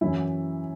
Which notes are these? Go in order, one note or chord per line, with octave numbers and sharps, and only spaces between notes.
F#2 E3 E4